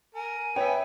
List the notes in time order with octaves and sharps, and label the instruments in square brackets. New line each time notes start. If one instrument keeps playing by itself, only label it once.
[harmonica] A#4 [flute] G#5
[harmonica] B3 [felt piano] C#5 [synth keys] E5 G5